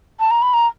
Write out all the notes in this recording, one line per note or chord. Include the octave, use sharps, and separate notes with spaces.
A5
A#5
B5
A#5